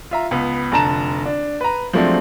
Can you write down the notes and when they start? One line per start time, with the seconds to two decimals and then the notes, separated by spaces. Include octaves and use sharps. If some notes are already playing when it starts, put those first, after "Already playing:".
0.11 F4 E5 A#5
0.31 C#2 B3
0.72 F1 D3 A5 A#5 E7
1.26 D4
1.61 B4 A#5
1.93 F3 F#3 G#3 A3 C4 D4